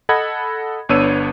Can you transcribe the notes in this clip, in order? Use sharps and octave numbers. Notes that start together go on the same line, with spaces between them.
A4 D#5 F#5 B5 G#6
G1 B3 D4 C#5 E6 D#7